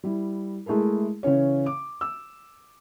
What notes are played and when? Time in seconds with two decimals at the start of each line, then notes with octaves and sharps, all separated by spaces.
0.04 G3 E4
0.66 G#3 A3 E4 G#4 A#4
1.23 C#3 E3 C#4 C#5
1.66 D6
2.01 E6